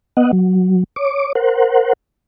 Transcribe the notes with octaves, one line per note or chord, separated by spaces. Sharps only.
B3 D#5 F#5
F#3
C#5 D6
A#4 C5 F#5